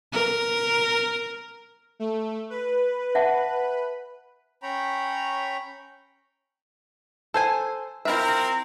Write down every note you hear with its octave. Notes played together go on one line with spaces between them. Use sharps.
A#4
A3
B4
E5 F#5 A5
C#4 C#5 G5 A#5 B5
A4 C5 G#5
C4 E4 F4 A#4 E5